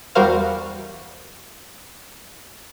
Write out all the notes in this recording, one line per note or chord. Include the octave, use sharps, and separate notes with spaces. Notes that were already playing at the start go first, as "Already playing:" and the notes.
E2 G3 F#4 A#4 C5 F5